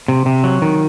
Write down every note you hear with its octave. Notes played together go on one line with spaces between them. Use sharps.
C3
C3
F#3
D#3